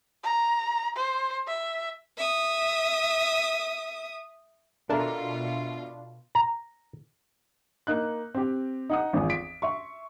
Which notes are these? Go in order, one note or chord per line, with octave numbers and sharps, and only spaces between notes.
A#5
C5
E5
E5 D#6
B2 D4 F4 A4 A#4 E5 F5
A#5
A#3 D#4 F#6
C4 G4
D#4 F#5 D#6
G#1 E2 F3
B6 D7
E5 C6 C#6